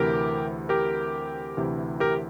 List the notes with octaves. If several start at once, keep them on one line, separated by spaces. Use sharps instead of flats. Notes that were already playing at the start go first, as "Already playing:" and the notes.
Already playing: D2 C3 E3 G4 A#4
G4 A#4
D2 C3 E3
G4 A#4